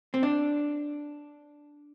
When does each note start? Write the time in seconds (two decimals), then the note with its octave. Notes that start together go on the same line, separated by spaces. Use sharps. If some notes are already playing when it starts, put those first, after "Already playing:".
0.14 C4
0.23 D4